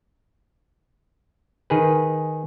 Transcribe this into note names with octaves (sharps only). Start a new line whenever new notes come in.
D#3 G#4 B4